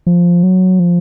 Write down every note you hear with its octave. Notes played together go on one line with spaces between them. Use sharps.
F3
F#3
F3